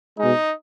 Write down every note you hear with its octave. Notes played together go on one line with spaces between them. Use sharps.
B2 G#3 D#4